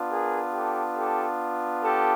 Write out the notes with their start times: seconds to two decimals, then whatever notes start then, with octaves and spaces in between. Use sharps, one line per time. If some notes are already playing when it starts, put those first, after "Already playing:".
Already playing: B3 D4 F4
0.10 G#4 A#4
0.54 G4 A4
0.97 G4 A4
1.83 G4 A4